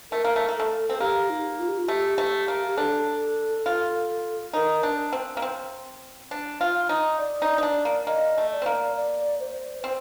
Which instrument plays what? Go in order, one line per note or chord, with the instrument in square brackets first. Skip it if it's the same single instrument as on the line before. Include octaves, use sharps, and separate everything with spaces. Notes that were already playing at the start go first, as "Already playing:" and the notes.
[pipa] A3 [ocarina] A#4
[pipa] A#3
A3
A#3
[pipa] A3 [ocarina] A4
[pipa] C4
[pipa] A#3 [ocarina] G4
[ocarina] D#4
F4
G4
F4
[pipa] A3 [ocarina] G4
[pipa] A3
A#3
[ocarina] G4
[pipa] D4 [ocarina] A4
[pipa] F4
[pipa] D#4 [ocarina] A#4
[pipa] D4
C4
A#3
C4
D4
F4
D#4
[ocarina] D5
[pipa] D#4
D#4
D4
A#3
[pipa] A#3 [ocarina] D#5
[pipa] A3
[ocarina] D5
[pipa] C4
A#3
[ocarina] D5
C5
[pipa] C4 [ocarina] C5